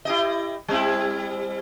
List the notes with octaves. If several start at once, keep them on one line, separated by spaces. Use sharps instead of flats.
E4 G4 D#5
G3 C4 E4